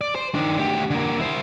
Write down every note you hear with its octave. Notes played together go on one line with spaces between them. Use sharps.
D5
C5
D#3 D4
D2 G4
D3 A#3
E4 C5